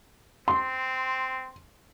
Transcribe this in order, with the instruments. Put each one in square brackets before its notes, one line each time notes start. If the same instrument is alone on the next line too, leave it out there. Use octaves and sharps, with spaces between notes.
[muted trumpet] C4 [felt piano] C6